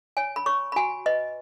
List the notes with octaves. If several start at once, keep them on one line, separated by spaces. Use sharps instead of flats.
C#5 G#5
B5
C#5 C#6
B5
F#4 G#5
B4 D#5